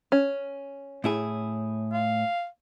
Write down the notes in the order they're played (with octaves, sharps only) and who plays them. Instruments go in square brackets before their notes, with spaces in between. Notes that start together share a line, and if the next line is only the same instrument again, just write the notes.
[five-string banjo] C#4
[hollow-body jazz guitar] A2 E4 G#4
[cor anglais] F5